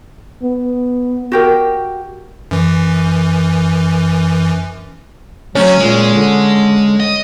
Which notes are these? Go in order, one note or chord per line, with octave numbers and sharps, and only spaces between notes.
B3
F#4 G4 A#4
F#2 E3
D2 F#3 A3 C#4
A#2 G#3
D3
D#5